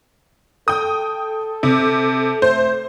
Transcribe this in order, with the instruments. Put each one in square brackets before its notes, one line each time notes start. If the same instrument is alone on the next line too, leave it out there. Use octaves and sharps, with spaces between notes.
[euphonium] A4 [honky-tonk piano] G5 D#6
[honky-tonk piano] C3
[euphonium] A3 [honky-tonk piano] C5